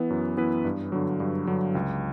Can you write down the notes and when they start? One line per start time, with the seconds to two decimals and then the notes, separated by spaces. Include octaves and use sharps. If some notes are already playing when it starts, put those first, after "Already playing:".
Already playing: E3 B3 E4 B4
0.10 F#2
0.37 E3 B3 E4 B4
0.65 G2
0.92 D3 F#3
1.20 G2
1.47 D3 F#3
1.75 C#2